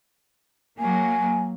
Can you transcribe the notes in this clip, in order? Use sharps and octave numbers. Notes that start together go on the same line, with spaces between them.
F#3 A#3 G#5